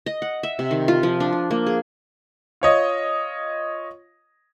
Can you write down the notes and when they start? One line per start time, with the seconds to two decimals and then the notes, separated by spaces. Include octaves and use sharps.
0.06 D#5
0.22 F#5
0.43 E5
0.59 C3
0.71 D#3
0.88 F4
1.03 F3
1.20 D4
1.33 F4
1.51 A#3
1.67 G#4
2.61 F4 C#5 D#5